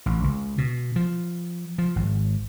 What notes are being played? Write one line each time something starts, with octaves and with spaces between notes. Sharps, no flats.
A1
C#2
B2
F3
F3
G#1